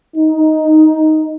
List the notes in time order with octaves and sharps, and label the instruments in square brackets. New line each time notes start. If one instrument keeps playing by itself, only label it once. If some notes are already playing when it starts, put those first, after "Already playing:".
[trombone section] D#4